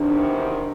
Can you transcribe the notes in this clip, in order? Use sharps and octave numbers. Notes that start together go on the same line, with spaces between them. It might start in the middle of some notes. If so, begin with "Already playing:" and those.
Already playing: E2 C3 D#3 D4